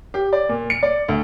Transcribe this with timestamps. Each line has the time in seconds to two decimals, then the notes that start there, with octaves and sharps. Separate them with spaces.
0.14 G4
0.33 D5
0.49 A#2
0.70 C#7
0.83 D5
1.08 D2